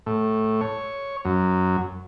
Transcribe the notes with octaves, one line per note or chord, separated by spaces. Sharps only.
A2
C#5
F#2